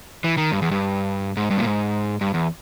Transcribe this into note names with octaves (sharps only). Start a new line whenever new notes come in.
E3
D#3
G2
E2
G2
G#2
G2
A#2
G#2
G2
E2